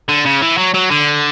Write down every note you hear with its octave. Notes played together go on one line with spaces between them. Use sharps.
D3
C#3
E3
F#3
F#3
D3